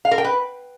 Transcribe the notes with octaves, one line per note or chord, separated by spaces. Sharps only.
F5
A#4
G5
B4